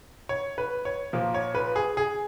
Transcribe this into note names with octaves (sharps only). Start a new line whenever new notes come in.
C#5
B4
C#5
A#2 F3 A#3
C#5
B4
G#4
G#4